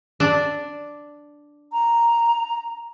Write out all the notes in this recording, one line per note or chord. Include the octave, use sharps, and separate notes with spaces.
D4
A#5